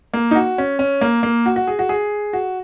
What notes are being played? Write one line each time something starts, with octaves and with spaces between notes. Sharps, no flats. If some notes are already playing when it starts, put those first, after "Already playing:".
A#3
D#4
F#4
C#4
C#4
A#3
A#3
F#4
F#4
G#4
F#4
G#4
F#4